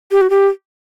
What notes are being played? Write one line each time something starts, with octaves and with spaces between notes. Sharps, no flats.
G4
F#4
G4